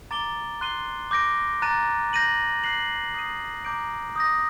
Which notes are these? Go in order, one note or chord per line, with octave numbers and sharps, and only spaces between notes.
A#5 D6 A6 D7 G7
C6 F#6 C7 D#7 G7
D6 G6 A#6 D7
A#5 F#6 A6 D#7
G6 A#6 D#7 F#7
F#6 C7 F#7
D#6 G6 C7 D#7
A#5 D6 G6 D7
D#6 G6 A#6